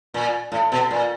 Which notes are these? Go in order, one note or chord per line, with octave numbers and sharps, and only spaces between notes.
A#2
A2
B2
A#2